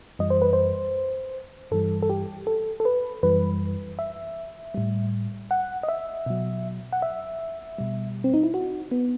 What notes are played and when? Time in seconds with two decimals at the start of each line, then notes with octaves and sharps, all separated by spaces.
0.19 F#2 E3 G3 D#5
0.30 C5
0.42 B4
0.53 C5
1.71 G2 E3 G3 A4
2.03 A4
2.10 G4
2.47 A4
2.80 A4
2.85 B4
3.23 F#2 E3 G3 B4
3.99 E5
4.74 A2 G3
5.51 F#5
5.83 D#5
5.89 E5
6.26 B2 F#3
6.93 F#5
7.02 E5
7.78 B2 G3
8.24 C4
8.34 D#4
8.43 E4
8.54 F#4
8.91 B3